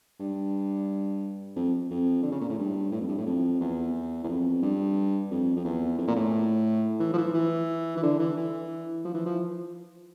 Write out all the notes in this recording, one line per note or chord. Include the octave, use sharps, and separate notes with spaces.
G2
F2
F2
D3
C#3
A#2
A2
G2
A2
F2
G2
A2
F2
E2
E2
F2
G2
F2
F2
E2
F2
A#2
A2
E3
F3
E3
E3
E3
D3
E3
E3
F3
E3
F3